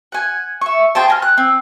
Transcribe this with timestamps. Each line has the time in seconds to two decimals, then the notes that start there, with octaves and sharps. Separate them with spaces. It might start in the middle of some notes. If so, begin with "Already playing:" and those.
0.12 F#5 G#5
0.61 E5 C#6
0.95 G#4 C5 G5 A5
1.08 G#5 A#5 F6
1.22 F#6
1.38 C4